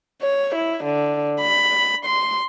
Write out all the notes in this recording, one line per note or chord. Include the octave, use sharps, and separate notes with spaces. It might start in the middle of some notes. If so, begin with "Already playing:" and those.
C#5
E4
D3
B5
C6